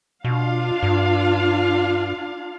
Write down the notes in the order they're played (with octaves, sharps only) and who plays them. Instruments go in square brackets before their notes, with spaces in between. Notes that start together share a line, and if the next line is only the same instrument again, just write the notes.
[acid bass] B2 [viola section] D4 F4 F5
[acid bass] G2